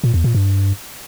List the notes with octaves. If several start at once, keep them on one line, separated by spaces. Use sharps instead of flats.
A#2
E2
A#2
G2